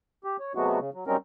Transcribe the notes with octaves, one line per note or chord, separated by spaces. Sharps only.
G4
C#5
C3 F#3 G#3 A3 B3 F#4
C#3
F#3
F#3 G3 C4 C#4 D#4 A#4